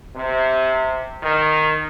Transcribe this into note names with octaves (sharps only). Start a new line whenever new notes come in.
C3
D#3